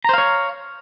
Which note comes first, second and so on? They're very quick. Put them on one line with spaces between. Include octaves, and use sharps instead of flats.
A#5 C5 F5 C#5